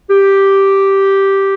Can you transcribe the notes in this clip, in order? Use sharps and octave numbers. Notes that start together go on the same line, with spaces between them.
G4